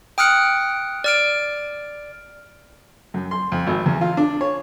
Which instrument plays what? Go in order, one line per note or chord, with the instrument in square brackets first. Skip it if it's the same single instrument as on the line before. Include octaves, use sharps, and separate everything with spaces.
[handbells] G5 D#6 F6 F#6 C#7
D5 F6 D7
[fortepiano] F#2
C6
F2
G#1
E2
F4
D4
C#5